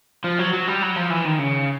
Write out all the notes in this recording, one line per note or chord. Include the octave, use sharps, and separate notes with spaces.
F3
F#3
F#3
G3
F#3
F3
E3
D#3
C#3